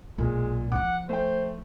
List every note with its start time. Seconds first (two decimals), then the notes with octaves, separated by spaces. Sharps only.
0.18 B1 A#2 G#3
0.72 F3 D#4 F#5 D6
1.09 A3 C5 G5